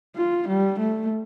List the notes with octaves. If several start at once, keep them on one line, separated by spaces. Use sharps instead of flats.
F4
G3
A3